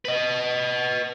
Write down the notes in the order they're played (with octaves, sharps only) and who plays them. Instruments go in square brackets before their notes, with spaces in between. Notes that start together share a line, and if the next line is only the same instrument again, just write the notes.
[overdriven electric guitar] B4 D#5